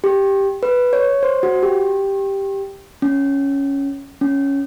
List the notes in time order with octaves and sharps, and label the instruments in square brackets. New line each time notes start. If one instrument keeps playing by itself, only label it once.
[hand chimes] G4
B4
C#5
C5
F#4
G4
C#4
C#4